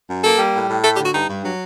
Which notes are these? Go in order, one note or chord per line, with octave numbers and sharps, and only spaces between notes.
F#2
A#3 A4
G3
A2
A2
A3 A4
G4
D3 F#4
G2 D#4
G2
F#3